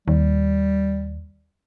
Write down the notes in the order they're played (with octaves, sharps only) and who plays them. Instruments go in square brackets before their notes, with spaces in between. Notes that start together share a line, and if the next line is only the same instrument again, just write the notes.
[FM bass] D#2 [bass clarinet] G3